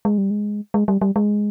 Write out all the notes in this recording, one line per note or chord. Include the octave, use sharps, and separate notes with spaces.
G#3
G3
G#3
G#3
G3
G3
G#3